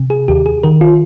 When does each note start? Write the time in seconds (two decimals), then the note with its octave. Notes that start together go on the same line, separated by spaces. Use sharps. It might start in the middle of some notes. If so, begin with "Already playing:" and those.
Already playing: C3
0.10 G#4
0.28 D#2 G4
0.46 G#4
0.63 D#3 A#4
0.81 F4